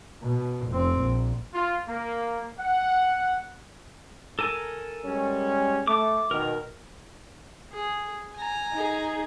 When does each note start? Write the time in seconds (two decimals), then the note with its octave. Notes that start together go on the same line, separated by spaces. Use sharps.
0.23 B2
0.68 F1 C4
0.99 A#1
1.54 F4
1.88 A#3
2.60 F#5
4.39 A4 A#4 G#5
5.05 G3 G#3 C#4
5.87 A3 D6
6.31 B2 D#3 A#4
7.73 G#4
8.36 G#5 A#5
8.73 D#4 G#4